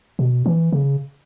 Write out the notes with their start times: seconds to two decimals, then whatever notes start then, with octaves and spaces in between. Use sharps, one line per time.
0.19 B2
0.46 E3
0.72 C#3